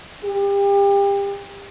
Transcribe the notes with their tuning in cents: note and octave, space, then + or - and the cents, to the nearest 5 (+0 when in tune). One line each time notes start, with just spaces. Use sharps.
G4 +30